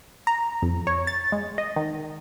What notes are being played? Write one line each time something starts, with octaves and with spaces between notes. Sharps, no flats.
A#5
F2
C#5
A6
G#3
D#5
D#3